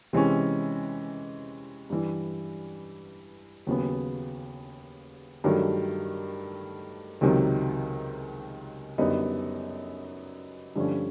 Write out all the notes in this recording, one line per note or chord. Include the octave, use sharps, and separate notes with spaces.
C3 E3 G#3 C#4
G2 E3 G3
D#2 C#3 F#3 B3
G2 D#3 F#3 A3
C#2 C3 D#3 F#3
F#2 D3 G3 B3 D#4
G2 D3 F3 A3 C#4